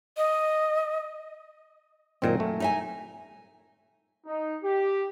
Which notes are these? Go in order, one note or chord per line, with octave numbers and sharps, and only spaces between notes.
D#5
F#2 A#2 D#3 C4 D#4 A#4
A3
D#4 E5 G#5
D#4
G4